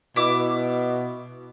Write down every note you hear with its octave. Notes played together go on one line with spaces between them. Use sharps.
B2 E4 D6